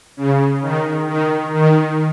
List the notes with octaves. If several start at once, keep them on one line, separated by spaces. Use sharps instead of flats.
C#3
D#3
D#3
D#3